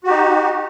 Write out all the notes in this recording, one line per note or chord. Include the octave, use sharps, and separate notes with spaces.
D#4 F#4 G4